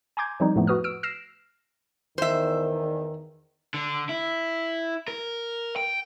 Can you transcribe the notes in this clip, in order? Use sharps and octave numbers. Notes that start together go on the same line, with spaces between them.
G#5 A#5 C6 D6 G6 G#6
E3 F3 G3 C4 D#4
F2 A2 F3 A3 B3
F#4 B4 D#6 F6
E6 F6 D7
E6 F6 A#6 C7 D7 E7
E2 D#3 C5 E5
D3
E4
A#4
G5